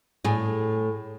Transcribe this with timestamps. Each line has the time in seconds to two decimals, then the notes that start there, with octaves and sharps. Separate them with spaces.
0.24 A2 G#4